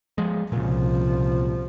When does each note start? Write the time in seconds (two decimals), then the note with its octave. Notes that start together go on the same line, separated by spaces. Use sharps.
0.18 F3 G#3
0.52 C2 A#2 C#3 F3